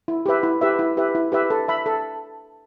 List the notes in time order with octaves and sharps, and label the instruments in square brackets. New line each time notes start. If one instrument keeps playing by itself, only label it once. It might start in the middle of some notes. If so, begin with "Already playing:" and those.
[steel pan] E4
G4 B4 E5
E4
G4 B4 E5
E4
G4 B4 E5
E4
G4 B4 E5
A4
E5 B5
A4